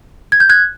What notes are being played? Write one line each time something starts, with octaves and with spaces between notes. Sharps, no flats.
G#6
G6
F#6 G#6